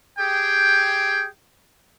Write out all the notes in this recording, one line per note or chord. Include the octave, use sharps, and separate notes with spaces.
G4 G#4 G5